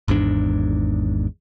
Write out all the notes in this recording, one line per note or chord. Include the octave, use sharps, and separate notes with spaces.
G#1 E2 G#2 D4